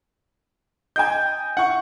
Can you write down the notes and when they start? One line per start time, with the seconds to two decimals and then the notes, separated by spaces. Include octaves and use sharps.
0.96 D#5 G5 G#5 G6
1.57 E4 F#5 C#6